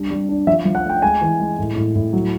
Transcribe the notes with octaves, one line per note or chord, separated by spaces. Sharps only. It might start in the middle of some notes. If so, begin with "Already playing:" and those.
Already playing: G3 D4
G3
D4
F3 E5
F3
F#5
A3 G5
G#3 G#5
E3
G#3
A2
A2
A2
F#3